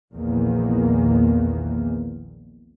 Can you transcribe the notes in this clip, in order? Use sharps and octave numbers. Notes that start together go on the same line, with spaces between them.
A#1 E2 D#3 A#3